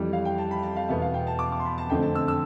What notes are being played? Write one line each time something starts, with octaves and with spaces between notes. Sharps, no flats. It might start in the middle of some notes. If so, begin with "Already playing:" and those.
Already playing: F2 E3 G3
F5
G5
A5
B5
A5
F5
E2 B2 B3 E5
F5
G5
A5
D6
D6
C6
B5
A5
F2 D3 A3 C4 G5
A5
E6
E6